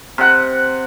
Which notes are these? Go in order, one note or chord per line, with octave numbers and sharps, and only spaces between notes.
C3 F#5